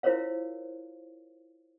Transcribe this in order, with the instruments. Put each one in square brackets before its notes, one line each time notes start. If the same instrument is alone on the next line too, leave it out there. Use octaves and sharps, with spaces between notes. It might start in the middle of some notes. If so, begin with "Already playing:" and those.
[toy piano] E4 F4 A#4 C5 C#5 F5